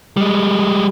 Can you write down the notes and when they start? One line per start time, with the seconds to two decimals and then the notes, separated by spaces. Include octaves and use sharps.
0.17 G3 G#3